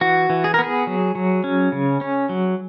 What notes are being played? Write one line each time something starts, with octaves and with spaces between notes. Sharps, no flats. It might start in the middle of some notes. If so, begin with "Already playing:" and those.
E3 F#4
E3
G#4
A#4
B3
G#4
F#3
F#3
C#4
C#3
C#4
F#3